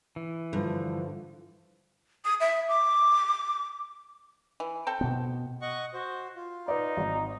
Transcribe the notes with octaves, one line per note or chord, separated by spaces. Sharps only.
E3
G2 D3 F3
D#6
E5
D6
E3
C4 A4 G5
B2 B3
D#5 F#5 C#6
F#4 C5
F4
D#4 B4 D5
G#1